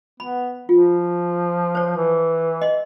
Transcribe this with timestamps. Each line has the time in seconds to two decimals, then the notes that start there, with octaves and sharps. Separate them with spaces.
0.20 B3 B5
0.69 F3 F4
1.75 C5 C#5
1.96 E3
2.62 D#5 C6